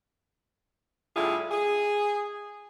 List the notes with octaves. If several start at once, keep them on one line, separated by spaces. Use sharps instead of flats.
A2 D3 G3 E4 F4 G#4
G#4